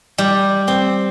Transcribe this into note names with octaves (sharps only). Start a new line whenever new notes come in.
G3
C4